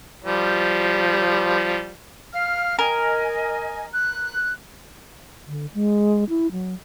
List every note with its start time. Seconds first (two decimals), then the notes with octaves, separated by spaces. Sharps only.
0.24 F3 G3
2.32 F5 F6
2.79 A#4 D#5 G#5
3.92 F#6
5.47 D3
5.74 G#3
6.29 E4
6.52 F#3